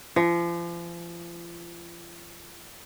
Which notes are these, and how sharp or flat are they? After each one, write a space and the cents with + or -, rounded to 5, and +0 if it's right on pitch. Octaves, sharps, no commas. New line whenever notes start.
F3 -35